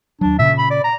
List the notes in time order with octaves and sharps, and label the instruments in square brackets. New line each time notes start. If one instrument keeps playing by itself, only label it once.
[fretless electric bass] D#2 F#3 [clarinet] D4
[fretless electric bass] A#2 C#3 [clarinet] E5
[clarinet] B5
D5
A#5